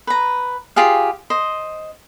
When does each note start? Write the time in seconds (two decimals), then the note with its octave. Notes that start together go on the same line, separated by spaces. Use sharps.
0.07 B4 A#5
0.76 F4 G4 G#4 F5
1.30 C5 D#5